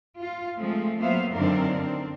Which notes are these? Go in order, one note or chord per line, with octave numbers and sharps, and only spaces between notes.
F4
F3 G#3 A3 C4
F#3 A#3 B3 C5 E5 F5
F#2 D3 D#3 C4 D4 A#4
C4